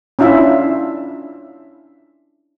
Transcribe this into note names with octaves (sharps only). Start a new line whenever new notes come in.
C#4 D4 E4 F4 E5